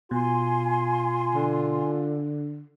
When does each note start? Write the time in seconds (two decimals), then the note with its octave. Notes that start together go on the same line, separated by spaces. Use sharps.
0.11 B2 F4 G#5 C6
1.35 D3